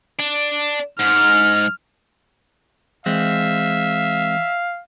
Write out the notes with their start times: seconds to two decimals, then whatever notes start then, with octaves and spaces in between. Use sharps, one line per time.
0.20 D4
0.99 G#2 F6
3.06 E3 G#3 C4 E5 F5